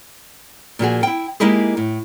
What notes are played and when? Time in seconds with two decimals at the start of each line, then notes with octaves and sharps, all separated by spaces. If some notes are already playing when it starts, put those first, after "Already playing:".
0.79 A#2 F3 F#4 G#4
1.03 E4 G5
1.40 G#3 A#3 D#4 E4 G4 G#4
1.77 A2